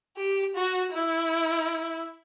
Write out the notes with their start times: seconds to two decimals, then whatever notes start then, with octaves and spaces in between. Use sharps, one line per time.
0.17 G4
0.55 F#4
0.93 E4